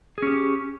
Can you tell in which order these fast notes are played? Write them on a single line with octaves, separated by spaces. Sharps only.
G#4 C#4 G4